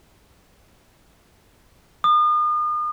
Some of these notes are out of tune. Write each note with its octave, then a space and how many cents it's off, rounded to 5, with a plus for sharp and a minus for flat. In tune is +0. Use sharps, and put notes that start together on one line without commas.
D#6 -40